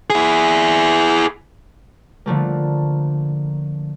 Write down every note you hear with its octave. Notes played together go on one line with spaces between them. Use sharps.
E4 G#4
D3 F3 A3 A#3